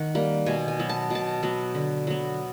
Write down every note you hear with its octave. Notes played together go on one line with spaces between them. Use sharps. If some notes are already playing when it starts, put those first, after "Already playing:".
Already playing: D#3 F#5
G3 A#3
B2 G#5
G#5
F#3 B3
A5
B2 A5
F#3 B3
D3
F#3 B3